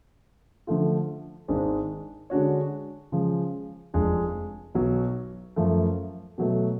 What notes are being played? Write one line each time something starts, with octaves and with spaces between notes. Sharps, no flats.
D3 F3 A3 F4
G#1 G#2 G#3 D4
D3 G#3 D4 F#4 C#5
C#3 F3 G#3
F1 F2 F3 G#3 D4
B1 B2 F#3
F#2 F3 A3
B2 F#3 A3